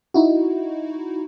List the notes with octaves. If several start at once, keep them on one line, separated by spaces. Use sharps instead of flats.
D#4 E4 F#4